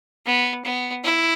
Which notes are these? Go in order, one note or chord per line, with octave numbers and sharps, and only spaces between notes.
B3
B3
E4